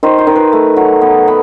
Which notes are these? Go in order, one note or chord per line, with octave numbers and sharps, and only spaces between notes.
D#3 C5
C5
D#3
B4
A3
F#3
B3
B3